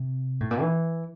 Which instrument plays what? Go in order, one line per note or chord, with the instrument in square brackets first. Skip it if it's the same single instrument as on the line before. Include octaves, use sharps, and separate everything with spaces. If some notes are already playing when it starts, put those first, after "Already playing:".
Already playing: [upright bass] C3
A2
A#2
E3